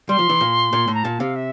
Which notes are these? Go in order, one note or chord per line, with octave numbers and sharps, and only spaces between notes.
G3 C6
F3
E3
A#2
A#2
A2
A#5
A#2 A5
C3 F5
E5